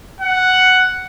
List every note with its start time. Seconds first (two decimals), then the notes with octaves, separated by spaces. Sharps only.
0.21 F#5